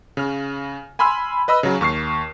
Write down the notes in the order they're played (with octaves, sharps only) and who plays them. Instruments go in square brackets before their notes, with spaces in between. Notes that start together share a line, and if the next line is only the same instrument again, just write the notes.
[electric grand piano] C#3 F6
G#5 B5 C6 E6 F6
B4 D#5 B5 E6
C#3 F#3
D#2 C#6 F6 C7